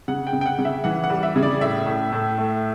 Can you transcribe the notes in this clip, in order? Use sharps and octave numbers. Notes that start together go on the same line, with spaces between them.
C#3 F#5
G5
C#3
G5
F#5
C#3
E5
E3 F#5
F#5
G3
E5
C#3
D5
A2 E5
A2
A2
A3